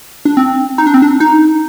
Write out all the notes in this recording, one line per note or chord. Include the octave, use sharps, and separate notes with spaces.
D4
C4
D#4
D4
C4
D4
D#4